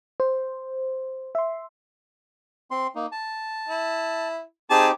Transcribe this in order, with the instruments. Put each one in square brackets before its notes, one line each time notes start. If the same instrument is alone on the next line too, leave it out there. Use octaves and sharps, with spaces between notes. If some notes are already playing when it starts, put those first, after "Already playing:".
[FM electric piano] C5
E5 C6
[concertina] C4 C6
A#3 D#4
A5
[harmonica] E4
[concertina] C4 D#4 G4 [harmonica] G#4 A5